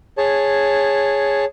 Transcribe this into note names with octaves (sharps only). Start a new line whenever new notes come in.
G#4 C#5 A5